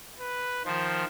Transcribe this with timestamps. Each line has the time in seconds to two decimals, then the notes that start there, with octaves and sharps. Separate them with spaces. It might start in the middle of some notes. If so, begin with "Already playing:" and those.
0.20 B4
0.65 D#3 F3 C5